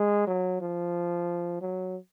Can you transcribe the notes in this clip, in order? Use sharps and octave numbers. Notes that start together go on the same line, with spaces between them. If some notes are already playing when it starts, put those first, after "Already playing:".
Already playing: G#3
F#3
F3
F#3